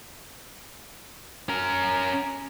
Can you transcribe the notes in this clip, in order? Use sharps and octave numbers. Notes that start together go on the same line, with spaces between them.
C#4 A#4